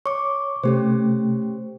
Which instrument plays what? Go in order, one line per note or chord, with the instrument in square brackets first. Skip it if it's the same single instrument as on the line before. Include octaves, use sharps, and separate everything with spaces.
[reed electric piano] C#5 [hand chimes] C#6 D6
[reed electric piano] C3 A3 [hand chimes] C#4 G4 C5